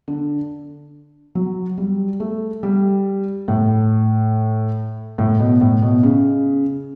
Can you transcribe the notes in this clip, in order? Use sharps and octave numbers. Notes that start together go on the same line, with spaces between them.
D3
F#3
G3
A3
G3
A2
A2
B2
A2
B2
C#3